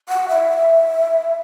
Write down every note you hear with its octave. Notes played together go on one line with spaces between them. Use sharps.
F#5
E5